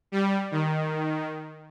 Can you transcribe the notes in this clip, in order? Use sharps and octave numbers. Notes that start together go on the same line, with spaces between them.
G3
D#3